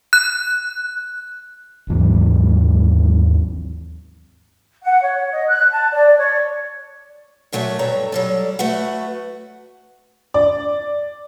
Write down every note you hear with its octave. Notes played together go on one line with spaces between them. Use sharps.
F#6
D#2 G#2 E3 F#3
F#5
C#5
D#5
F#6
A5
D5
C#5
A#2 F#3 A3 F#4 E5
G2 A4 C#5 A#5
F#3 G3 A4
A3 F#4 B4 F#5
D5